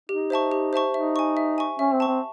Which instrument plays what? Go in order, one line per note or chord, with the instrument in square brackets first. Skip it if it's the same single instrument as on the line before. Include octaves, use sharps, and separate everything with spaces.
[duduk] D#4 [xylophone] G4
[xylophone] C5 E5 A5 C#6
G4
C5 E5 A5 C#6
[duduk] D#4 [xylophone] E5
[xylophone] G#5 C#6
E5
G#5 C#6
[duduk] C#4 [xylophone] E5
[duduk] C4
[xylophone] A5 C#6
[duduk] C4